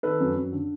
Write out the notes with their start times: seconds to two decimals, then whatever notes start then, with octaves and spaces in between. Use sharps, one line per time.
0.03 D#3 A4 B4
0.20 F#2
0.35 F#2
0.53 D3